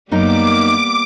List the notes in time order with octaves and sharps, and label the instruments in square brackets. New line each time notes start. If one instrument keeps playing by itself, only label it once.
[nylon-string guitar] F#2 D#4 A#4 [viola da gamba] G3 A#3 B3 [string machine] D6